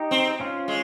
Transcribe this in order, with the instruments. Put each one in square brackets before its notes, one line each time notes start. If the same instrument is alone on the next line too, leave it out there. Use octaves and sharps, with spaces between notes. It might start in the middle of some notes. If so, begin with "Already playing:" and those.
Already playing: [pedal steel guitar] D#4 G4
[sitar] C4
[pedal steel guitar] C#4 F4
[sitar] G#3